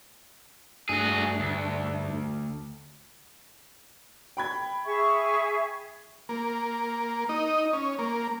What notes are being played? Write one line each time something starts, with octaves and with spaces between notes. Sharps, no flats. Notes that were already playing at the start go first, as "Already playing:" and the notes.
G2 A3 D4 F#4 G#4
D2
G5 B5 G#6
G#4 E5 C#6
A#3
D#4
C#4
A#3